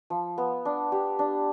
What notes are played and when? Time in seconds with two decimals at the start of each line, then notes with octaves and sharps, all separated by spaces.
0.10 F3
0.38 B3
0.65 D4
0.92 G4
1.19 D4